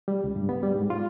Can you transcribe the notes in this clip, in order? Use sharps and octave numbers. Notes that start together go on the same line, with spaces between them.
G3
C#2
G2
B3
G3
G#2
F4